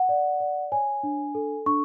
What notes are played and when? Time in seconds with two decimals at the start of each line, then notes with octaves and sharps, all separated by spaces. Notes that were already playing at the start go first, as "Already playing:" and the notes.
Already playing: F#5
0.09 D5
0.40 D5
0.72 C#5 G#5
1.03 D4
1.35 A4
1.66 D4 C#6